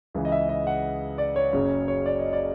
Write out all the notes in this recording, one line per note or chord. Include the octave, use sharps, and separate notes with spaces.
C#2 C#3 E3
D#5
E5
D#5
F#5
D5
C#5
F#1 F#2 C#3
C#5
D5
D#5
D5